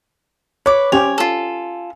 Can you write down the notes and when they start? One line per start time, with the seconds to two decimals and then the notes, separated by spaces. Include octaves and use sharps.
0.66 B4 C#5 D6
0.92 C#4 G4 C5 C#5 G#5 F7
1.18 F4 A4